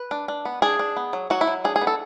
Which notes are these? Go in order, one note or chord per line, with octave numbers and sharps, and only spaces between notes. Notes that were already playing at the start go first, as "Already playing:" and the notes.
Already playing: B4
D4
D4
B3
D4 G#4
D4
B3
F#3
F#3 F#4
E4
F#3
D4 G#4
G#4
B3
A4